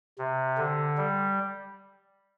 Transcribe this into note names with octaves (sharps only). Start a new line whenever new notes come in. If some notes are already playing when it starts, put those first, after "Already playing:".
C3
D3
G3